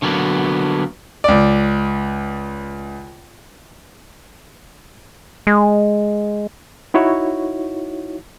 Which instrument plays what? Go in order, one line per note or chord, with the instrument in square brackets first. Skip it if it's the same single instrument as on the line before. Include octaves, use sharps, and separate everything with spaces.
[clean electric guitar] D3 F#3 A#3 B3
[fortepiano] C#2 D5
[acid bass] G#3
[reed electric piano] D#4 E4 F#4 C#5